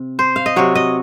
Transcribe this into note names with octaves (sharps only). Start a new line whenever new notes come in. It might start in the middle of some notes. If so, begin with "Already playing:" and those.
Already playing: C3
C5
F5
D#5
C3 F#3 C#5
D#5